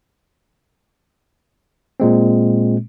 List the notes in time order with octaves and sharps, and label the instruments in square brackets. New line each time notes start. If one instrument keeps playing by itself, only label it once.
[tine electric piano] A#2 G#3 C4